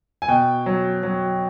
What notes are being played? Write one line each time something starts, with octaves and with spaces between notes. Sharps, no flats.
G#5
B2 G5
F#3
F#3